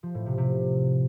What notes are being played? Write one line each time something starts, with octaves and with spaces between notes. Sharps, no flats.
F3
A2
C3
C3